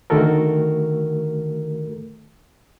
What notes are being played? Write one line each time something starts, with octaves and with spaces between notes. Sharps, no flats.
D3 D#3 A3 F#4 A4 A#4